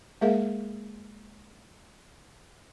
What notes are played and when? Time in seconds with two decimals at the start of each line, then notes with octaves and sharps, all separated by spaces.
0.21 G#3 A#3 G#4 A#4 E5 F5